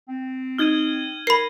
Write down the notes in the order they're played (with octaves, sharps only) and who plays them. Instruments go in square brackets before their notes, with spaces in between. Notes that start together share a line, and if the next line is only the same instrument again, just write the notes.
[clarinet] C4
[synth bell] D#4 G7 [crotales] F6 G#6 D#7
[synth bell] A#4 [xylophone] B5 C7 [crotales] G#6